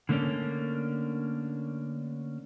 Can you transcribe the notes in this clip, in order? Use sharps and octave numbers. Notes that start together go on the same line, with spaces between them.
D3 A3 A#3 C#4 D4